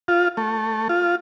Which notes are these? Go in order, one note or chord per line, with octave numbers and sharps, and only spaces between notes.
F4
A3
F4